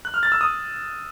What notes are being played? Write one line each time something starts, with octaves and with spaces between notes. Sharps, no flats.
F#6
F6
A6
E6
D#6